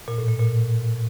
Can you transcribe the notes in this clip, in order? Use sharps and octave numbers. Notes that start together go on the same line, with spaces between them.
A#2
A2
A#2
A#2